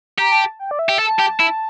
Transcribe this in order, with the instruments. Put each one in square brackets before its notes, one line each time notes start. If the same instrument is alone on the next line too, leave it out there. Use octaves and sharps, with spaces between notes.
[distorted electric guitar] G4 [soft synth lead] A#5
[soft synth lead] A5
G5
D5
E5
[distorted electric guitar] G4
[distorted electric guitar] A4 [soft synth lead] A5
[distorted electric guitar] G4
E4